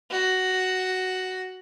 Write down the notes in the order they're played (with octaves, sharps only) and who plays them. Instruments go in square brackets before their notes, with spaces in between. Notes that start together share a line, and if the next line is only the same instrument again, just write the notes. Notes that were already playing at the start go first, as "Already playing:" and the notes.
[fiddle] F#4